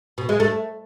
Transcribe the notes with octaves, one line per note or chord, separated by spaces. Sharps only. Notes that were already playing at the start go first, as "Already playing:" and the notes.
B2
G#3
A3